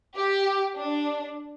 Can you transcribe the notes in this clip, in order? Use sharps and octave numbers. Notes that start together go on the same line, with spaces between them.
G4
D4